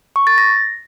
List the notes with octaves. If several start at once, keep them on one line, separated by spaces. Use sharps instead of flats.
C#6
A6
A#6